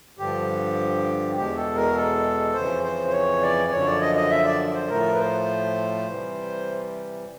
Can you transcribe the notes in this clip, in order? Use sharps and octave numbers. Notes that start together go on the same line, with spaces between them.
G2 D3 F3 G4
E2 B2 G#3 G4
A4
A#4
A4
F2 C#3 E3 C5
C5
C5
C#5
D5
F#2 D3 F3 C#5
D5
D#5
D#5
E5
D5
C5
A2 F3 A3 A#4
B4
C5
C3 E3 G3